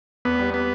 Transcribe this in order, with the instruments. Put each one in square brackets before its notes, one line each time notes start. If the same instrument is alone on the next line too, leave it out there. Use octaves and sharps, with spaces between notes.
[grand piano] E2 [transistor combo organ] B3
[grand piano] G3
[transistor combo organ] B3